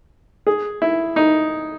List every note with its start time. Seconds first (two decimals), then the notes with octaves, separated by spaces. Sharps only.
0.47 G#4
0.82 E4
1.16 D#4